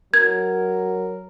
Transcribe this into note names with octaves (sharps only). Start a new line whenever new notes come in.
F#3 A#4 G#6